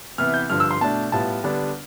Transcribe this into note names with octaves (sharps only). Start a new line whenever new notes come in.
C3 E3 B3 E4 F6
G6
G2 D3 F3 F6
E6
C6
B2 A3 D4 A5
A2 G3 B3 F4 A5
D3 G3 B3 D4